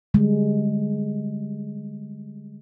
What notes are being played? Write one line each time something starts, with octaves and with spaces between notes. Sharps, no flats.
D3 G3 G#3